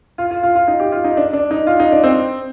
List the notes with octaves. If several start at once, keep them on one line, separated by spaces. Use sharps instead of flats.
F4
F4
F4
F4
D#4
G4
F4
D#4
D4
D4
D#4
F4
D#4
D4
C4